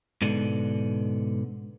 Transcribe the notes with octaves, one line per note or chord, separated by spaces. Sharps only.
G#2 B2 D3